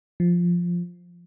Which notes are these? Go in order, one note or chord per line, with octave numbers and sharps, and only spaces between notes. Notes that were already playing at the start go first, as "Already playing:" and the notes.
F3